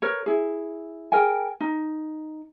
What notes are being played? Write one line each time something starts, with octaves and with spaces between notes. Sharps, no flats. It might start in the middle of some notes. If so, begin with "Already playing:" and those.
A#4 B4 C#5
E4 G#4
G#4 A#4 G5 G#5
D#4